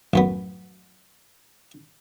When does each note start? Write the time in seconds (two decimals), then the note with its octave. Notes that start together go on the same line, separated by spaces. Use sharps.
0.14 A1 F#2 B3